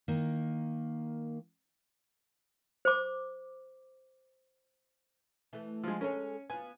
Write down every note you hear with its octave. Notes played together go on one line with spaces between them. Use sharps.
D#3 A#3
C5 D6
E3 A3
F3 G#3
G#3 C#4 A4 A#4 C#5
B3 F4 G#5